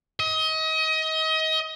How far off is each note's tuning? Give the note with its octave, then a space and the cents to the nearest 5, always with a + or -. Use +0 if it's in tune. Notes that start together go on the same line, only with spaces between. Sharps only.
D#5 +30